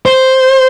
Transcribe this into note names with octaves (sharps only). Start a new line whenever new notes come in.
C5